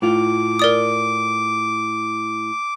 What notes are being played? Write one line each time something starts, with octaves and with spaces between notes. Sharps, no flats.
A2 F4 D6
A#4 D5 D#6